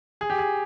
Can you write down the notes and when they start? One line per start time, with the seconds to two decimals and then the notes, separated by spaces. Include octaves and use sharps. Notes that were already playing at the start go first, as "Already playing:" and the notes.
0.21 G#4
0.30 G4
0.39 G#4